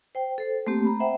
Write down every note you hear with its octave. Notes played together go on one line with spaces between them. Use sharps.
C5 G5
A4 C5
A3 A#3 C4 G4
A#5 B5
C5 E5 F#5 G5